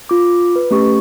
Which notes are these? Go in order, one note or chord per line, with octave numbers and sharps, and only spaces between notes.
F4 D6
B4
A3 C#4 G4 C#6